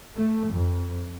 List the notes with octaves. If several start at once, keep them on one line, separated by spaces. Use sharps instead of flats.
A3
F2